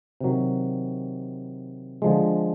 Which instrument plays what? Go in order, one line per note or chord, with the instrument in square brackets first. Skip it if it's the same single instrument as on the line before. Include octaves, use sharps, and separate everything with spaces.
[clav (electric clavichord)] C3 D#3 F#3
D3 F3 G#3